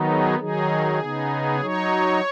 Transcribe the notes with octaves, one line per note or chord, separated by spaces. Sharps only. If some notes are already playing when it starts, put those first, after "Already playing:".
Already playing: D#3 F#3 B3 D#4
G#4
D#3 F#3 D#4 G#4
C#3 B3 D#4
F#3 D#4 C#5